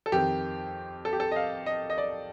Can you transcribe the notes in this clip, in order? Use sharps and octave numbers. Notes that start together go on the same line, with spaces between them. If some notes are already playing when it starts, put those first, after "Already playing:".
A4
F2 D#3 G4
A4
G4
A4
D#5
F5
D#5
D#5
D5